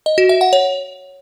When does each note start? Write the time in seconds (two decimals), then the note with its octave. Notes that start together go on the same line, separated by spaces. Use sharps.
0.06 D#5
0.18 F#4
0.29 E5
0.41 F#5
0.53 C#5